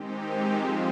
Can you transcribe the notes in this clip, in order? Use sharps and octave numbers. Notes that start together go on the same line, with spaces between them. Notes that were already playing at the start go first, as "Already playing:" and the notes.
Already playing: D#3 G#3 C4 D#4 G4
F3 G#3 C4 F4